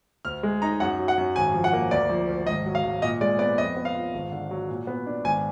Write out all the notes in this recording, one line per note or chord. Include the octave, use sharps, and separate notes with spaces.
D2 F6
G#3
D#4 A#5
F#2 F#5
F#3
F#5
F#2
G#1 G#5
F3
F#5
A#3
D2 D5
F3
D2
G#1 D#5
F#3
F5
G#1
A#2 D#5
G#3 D5
B3 D5
F2 D#5
B3
F5
F4
G#1
D3
F#3
A#2
B3
D4
G#1 G#5